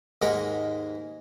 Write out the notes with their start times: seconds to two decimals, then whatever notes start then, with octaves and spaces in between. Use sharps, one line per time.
0.22 D#2 G#2 G#3 A#4 F#5 B5